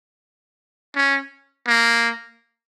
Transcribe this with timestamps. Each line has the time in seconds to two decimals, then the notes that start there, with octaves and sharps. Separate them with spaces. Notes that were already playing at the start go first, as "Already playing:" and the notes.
0.96 C#4
1.67 A#3